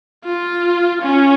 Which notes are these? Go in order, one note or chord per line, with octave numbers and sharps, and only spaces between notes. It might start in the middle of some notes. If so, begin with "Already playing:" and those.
F4
C#4